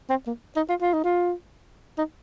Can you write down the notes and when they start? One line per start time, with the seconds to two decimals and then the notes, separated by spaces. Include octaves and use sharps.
0.10 C4
0.27 A#3
0.56 D#4
0.69 F4
0.82 F4
0.93 D#4
1.04 F4
1.98 D#4